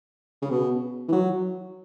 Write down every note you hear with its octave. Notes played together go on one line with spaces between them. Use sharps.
C#3
B2
E3
F#3